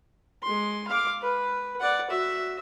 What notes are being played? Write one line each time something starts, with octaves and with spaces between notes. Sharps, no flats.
G#3 C6
F5 D6
B4
D5 F#5
F#4 E5